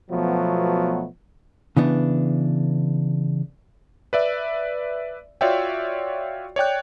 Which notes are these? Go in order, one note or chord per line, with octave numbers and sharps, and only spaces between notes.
B2 F3 F#3 A3 B3
C#3 E3 B3 D4
B4 D5 E5
F4 F#4 C#5 D5 E5 G5
C#5 D5 G5 F#6